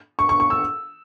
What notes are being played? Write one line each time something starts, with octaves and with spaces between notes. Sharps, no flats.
C#6
C#6
C#6
E6